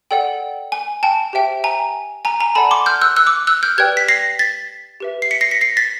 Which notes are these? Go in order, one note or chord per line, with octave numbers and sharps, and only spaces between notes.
A4 D5 F#5 G5
G#5
G5 A5
G4 C5 E5 G5
G#5 A#5
G#5 A#5
G#5 A#5
A4 D5 F#5 A5 B5
C6 D6
F6 G6
E6 F#6
E6 F#6
D6 E6
E6 F#6
F6 G6
G4 B4 D5 G5 F#6 G#6
B6
A#6 C7
A6 B6
G4 B4 E5
C7
B6 C#7
A#6 C7
B6 C#7
A#6 C7
A6 B6